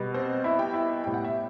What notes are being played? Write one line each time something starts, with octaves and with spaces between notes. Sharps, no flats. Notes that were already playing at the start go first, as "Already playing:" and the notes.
Already playing: B2 G3 B3
C4 C5
E4 E5
G4 G5
E4 E5
A2 G3 B3 G5
F#5
E5